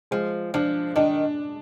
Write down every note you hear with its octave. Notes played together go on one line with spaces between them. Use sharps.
F3 G#3
F3 D4
D#3 D4